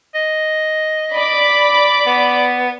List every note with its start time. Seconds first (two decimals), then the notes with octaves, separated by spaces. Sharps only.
0.14 D#5
1.15 D5 B5 D6
2.06 B3